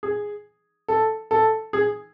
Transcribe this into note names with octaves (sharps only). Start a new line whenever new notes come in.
G#4
A4
A4
G#4